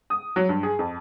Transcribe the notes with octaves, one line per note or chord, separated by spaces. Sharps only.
D#6
F#3
G2
G#4
F2